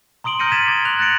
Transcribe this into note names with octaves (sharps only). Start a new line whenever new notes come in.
A#5 C6 D#6 D7 F#7 G7
F6 G6 A#6 C#7 D#7 F#7
G#6 A6 B6 D#7 E7
D6 G#6
F#6 F7 F#7
F#6 A6 A#6 C#7 D7